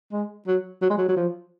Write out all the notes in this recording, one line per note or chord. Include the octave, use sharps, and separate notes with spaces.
G#3
F#3
F#3
G#3
F#3
F#3
F3